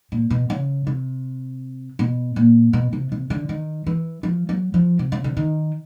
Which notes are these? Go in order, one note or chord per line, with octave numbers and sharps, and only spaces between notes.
A#2
B2
C#3
C3
B2
A#2
B2
C3
C3
D3
D#3
E3
F3
F#3
F3
C3
C#3
D3
D#3